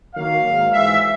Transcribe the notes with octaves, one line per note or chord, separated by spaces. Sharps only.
D#3 F#3 A#3 F5
G#2 D#3 F#3
G#2 E3 G#3 E5